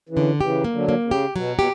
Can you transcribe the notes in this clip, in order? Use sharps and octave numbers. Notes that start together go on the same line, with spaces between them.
C#3 E3
D3
C#3 E3 G4
A#3
D3 F#3
A#3
C#3
G4
B2 F#3
B2 G4